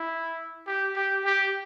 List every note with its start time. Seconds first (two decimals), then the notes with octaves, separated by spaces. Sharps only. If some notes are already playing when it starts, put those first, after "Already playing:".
Already playing: E4
0.67 G4
0.96 G4
1.25 G4